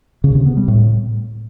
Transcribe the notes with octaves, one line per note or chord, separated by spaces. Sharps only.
C#3
C3
B3
G3
A2